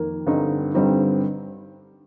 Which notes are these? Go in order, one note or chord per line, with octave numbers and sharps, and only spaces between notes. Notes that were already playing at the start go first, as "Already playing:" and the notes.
Already playing: F2 D#3 A#3
G2 D3 G3 C4 D#4
G2 D3 G3 C4 D#4